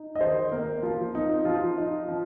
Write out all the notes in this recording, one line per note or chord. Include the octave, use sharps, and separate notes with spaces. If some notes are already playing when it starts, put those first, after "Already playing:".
Already playing: D#4
D#5
D#3 C5
A#3 A#4
F3 F4
C4 D#4
F3 F4
D#4
F3